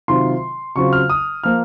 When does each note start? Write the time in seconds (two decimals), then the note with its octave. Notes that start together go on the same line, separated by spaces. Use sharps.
0.08 C3 D#3 F#3 C4 F4 C6
0.76 C#3 F#3 C4 F4 C#6
0.93 F6
1.10 D#6
1.43 F3 A#3 F6